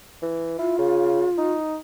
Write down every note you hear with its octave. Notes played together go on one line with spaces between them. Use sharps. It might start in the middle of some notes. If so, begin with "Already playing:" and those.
E3
E4 F4
C#3
D#4